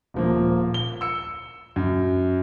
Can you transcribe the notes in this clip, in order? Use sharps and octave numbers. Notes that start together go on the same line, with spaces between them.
D#1 F3 A#3
G7
E6 C#7
F#2